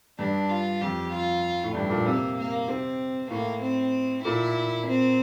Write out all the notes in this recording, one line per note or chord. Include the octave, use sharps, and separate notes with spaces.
G2 D4
F4
F2 G4
F4
A2
G2 D4
A#2
C3 A#3
A#3
C3 C4
A2 A#3
C4
A#2 E4
C4